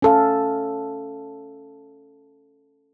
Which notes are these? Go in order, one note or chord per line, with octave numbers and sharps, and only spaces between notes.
C#4 A4 F5